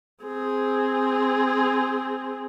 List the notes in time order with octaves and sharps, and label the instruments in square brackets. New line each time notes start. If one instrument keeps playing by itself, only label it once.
[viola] C4 G#4